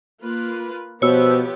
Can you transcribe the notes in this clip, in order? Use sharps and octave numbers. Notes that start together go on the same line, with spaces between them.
A#3 F4 B4
B2 F3 B3 G4 C5 C#5 E6